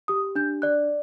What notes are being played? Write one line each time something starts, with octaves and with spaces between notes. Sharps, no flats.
G4 D#6
D4 G6
D5 F#6